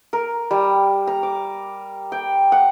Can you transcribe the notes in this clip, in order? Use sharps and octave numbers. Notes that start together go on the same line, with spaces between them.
A#4
G3
A#5
D6
G5
F#5